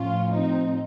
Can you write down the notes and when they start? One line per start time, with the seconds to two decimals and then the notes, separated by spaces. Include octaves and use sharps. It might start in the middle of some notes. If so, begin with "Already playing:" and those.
Already playing: A2 F3 C#4 F4
0.33 C4 D#4